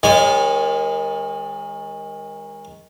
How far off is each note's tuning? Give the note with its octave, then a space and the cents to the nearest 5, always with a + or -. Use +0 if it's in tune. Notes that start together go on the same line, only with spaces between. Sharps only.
D#3 +15 G#3 -30 C#5 -25